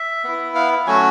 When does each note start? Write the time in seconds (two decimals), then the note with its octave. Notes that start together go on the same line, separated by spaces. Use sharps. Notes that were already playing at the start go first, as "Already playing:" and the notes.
Already playing: E5
0.24 B3 E4
0.55 F5
0.87 F#3 A3 C#4 F#4 G#5